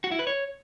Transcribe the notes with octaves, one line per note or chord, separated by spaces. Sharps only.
F#4
E4
B4
C#5